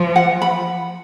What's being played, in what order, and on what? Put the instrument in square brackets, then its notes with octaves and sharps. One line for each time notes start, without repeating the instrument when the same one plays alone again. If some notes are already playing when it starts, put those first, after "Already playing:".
Already playing: [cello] F3
[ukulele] F#5
B5